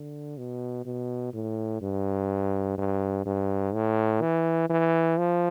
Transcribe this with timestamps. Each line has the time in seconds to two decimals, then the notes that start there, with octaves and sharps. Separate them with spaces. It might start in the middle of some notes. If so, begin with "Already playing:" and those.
Already playing: D3
0.38 B2
0.85 B2
1.34 A2
1.82 G2
2.78 G2
3.26 G2
3.74 A2
4.22 E3
4.70 E3
5.18 F3